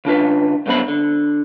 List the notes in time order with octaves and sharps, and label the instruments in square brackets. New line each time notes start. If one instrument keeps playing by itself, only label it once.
[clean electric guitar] C#3 D4 F4 B4
C2 F#2 D3 B3 C5 B5
D3